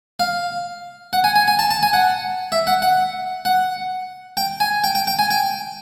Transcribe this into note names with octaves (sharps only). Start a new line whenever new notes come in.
F5
F#5
G#5
G#5
G#5
A5
A5
G#5
F#5
E5
F#5
F#5
F#5
G5
G#5
G5
G5
G5
G#5
G5